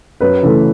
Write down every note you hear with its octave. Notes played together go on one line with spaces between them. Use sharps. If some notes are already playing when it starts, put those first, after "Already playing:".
F#2 B4
C#3 E3 A3 A4